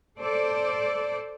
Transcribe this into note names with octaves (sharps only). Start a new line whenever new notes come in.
A4 C5 D5